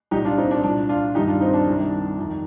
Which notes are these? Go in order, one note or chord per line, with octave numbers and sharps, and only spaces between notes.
C2 A#2 D#4 G4
D4 F4
C4 D#4
D4
C2 A#2 D4
D4 F4
G2 D#3 D#4 G4
D4 F4
C4 D#4
D4
C2 C3 D#3
F2 D#3